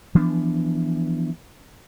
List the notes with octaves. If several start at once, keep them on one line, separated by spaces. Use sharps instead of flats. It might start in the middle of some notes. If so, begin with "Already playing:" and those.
E3 F3 B3 D4